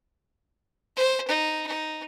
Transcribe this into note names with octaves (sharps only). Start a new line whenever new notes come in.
C5
D#4
D#4